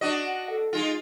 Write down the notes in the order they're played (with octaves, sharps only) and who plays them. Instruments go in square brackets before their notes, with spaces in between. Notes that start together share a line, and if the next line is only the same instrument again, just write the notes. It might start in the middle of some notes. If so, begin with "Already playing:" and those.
[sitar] D4 F#4 D#5
[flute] F#5
A4
[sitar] G#3 F4 [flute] D#4